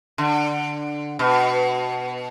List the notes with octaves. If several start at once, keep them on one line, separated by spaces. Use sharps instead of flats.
D3
B2